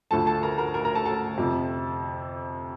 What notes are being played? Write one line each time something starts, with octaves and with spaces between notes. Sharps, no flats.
D2 D3 F3 A3 A4 A5
A4 A5
A#4 A#5
A#4 A#5
A#4 A#5
A#4 A#5
A4 A5
A4 A5
F2 C3 F3